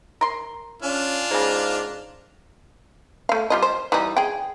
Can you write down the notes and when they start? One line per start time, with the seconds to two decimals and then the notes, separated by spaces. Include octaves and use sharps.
0.21 A#4 C6
0.82 C#4 D4 F4
1.31 G#2 C#3 A#3
3.29 A3 F5
3.50 G3 F4 D#5
3.62 C5
3.92 E3 G3 D#4
4.17 G#4 G5